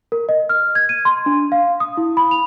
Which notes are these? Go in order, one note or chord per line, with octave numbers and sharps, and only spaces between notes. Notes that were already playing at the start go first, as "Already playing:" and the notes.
A#4
D#5
F6
G#6
D#7
C6
D4
F5
D#6
E4
B5
F7